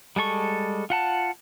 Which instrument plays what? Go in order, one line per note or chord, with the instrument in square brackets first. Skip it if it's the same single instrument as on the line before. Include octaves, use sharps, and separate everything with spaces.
[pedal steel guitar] G3 G#3 A4 C#6
F4 F#5 A5